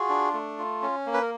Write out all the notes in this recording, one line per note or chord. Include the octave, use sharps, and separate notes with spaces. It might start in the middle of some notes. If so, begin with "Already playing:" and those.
Already playing: F4 F#4 G#4
D4
A3
F4
C#4
A#3
B4
A#4